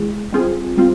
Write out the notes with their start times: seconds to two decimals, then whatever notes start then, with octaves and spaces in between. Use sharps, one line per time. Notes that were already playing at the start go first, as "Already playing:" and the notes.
Already playing: E3 G#3 E4 G#4
0.32 G3 C4 F4 G#4
0.77 G3 C4 F4